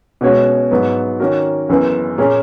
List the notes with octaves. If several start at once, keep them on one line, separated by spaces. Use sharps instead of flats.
B2 G#3 C#4 F#4 C#5
G#2 F#3 B3
D#3 A#3 C#4 F#4 A#4
F#1 F#2 E3 B3
A#2 A#3 C#4 G#4